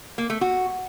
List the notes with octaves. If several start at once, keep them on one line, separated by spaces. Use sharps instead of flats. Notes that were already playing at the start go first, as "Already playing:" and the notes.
A#3
A3
F#4